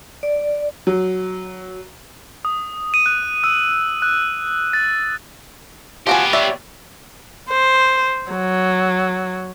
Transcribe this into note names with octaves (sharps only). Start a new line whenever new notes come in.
D5
F#3
D#6
D#7
F#6
E6
F#6
A6
F3 B3 F#4 G4 G#5
C#5 D5 E5
C5
F#3